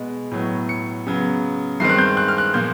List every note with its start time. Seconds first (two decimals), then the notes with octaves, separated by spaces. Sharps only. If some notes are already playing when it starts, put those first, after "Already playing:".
Already playing: B2 G#3 B3
0.31 A2 F#3 B3
0.69 C#7
1.07 C#3 F#3 B3
1.80 G2 D#3 G#3 C4 C7
1.90 F#6
1.98 G6
2.17 F#6
2.28 F6
2.38 F#6
2.54 A#2 F3 A#3 G6